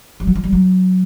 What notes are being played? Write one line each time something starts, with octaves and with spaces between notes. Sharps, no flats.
G3
F#3
F3
G3
F#3